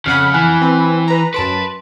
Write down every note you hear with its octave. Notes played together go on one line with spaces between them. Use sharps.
F2 C#3 F#5 B5 F6 F#6
E3 G#5 F#6
C4 B4
B4 A#5
F#2 B4 A5 C6 D7